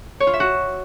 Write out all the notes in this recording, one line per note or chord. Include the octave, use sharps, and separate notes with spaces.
C#5
F4
E5
F#4